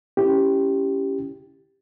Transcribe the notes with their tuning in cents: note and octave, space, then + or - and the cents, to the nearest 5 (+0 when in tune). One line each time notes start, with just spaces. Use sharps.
C#4 +0 E4 +10 G4 +0